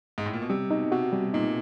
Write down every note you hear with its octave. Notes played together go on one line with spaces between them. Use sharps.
G#2
A2
A#2
B2
C3 G3
B2 D#4
C3 F#4
B2 G3
A#2 D#4